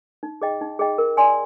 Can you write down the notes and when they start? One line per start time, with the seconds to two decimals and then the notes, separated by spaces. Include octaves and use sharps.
0.23 D#4
0.42 G#4 D#5 G5
0.61 D#4
0.79 G#4 D#5 G5
0.98 A#4
1.17 D5 G#5 C6